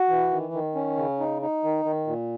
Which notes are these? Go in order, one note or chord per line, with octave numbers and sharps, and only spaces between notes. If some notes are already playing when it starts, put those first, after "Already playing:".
Already playing: F#4
E3
D#3
D#3
C#4
C#3
D#4
D#4
D#3
D#3
A#2